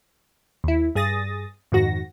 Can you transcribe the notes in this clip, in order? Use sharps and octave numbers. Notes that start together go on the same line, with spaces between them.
D#2 E4
G2 G#4 D#6 A6 A#6
F2 G#2 D#3 F#4 A#6